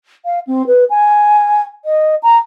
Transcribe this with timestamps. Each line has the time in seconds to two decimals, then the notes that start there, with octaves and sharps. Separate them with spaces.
0.25 F5
0.47 C4
0.67 B4
0.90 G#5
1.85 D#5
2.23 A#5